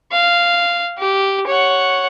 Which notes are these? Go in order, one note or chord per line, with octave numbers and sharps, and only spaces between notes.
F5
G4
C#5 F#5